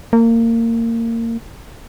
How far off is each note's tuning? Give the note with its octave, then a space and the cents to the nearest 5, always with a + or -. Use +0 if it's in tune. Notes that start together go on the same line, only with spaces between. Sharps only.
A#3 -25